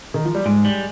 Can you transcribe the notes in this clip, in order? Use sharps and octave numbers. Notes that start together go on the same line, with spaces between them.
D#3
F3
G3
G#2 G#3
G3